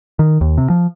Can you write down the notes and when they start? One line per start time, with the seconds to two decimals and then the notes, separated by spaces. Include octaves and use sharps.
0.19 D#3
0.41 D#2
0.58 C3
0.70 F3